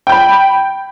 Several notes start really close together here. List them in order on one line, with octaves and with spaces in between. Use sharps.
G5 G6 B5